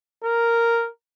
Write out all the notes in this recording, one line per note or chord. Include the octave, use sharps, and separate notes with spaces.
A#4